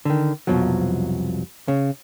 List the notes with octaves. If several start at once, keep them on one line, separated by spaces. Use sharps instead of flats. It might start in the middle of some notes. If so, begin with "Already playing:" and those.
D3 D#3
C2 F2 B2 F3 F#3
C#3